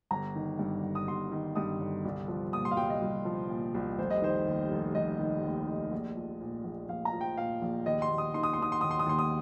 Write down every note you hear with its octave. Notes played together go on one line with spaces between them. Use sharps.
G1 A#5
D#3
G2
G1
D#6
G1 C6
D#3
G2 D#6
G1
C2
F3
A#2 D#6
C6
F5
C2 G5
D#5
C2
F3
A#2
C2
F1 C5
D#5
D#3 C5
D#2
F1
F1 D#5
D#3
D#2
F1
A#1
F3
A#2
A#1
A#1 F5
A#5
F3
G5
A#2 F5
A#1
D#2 D#5
C6
D#2
D#6
D#3 C6
D#6
C6
D#3 D#6
C6
D#2 D#6
C6
D#6
D#2 C6
D#6